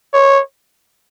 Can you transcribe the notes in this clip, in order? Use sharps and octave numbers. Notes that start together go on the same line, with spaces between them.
C#5